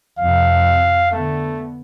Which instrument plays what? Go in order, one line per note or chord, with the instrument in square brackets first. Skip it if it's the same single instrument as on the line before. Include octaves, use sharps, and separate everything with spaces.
[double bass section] F2 C3 [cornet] F5
[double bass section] D3 B3 [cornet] A3